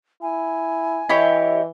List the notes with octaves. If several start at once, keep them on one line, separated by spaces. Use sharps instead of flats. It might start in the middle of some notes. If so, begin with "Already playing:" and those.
E4 G#5
E3 E4 G4 C#5 D#5